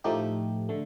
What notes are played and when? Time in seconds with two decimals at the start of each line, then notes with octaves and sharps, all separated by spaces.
0.04 A2 F3 A3 D#4 G4
0.69 D3 A3